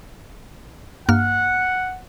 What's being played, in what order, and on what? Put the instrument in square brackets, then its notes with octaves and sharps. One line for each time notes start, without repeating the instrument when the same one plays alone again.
[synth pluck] G2 A#3 F6 [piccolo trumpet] F#5